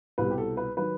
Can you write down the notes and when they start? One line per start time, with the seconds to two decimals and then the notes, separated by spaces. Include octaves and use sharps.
0.18 C2 B2 G3 B4
0.30 G4
0.38 A4
0.57 B4
0.77 D#3 F#3 B4